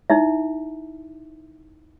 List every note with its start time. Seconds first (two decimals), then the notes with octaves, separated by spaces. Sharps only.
0.10 D#4 E4 E5